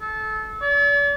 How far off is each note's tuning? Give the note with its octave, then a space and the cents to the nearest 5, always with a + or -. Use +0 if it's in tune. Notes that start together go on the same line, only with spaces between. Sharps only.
A4 -25
D5 -45